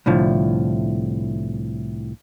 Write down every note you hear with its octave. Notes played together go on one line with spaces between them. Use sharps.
C2 A2 D3 F3